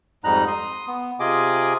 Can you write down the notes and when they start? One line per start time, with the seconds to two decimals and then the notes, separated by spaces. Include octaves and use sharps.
0.24 F2 G#2 G3 D#4 A#5 F#6
0.48 C6 D#6
0.88 B3
1.20 C3 F4 G#4 D#5 G#5 D6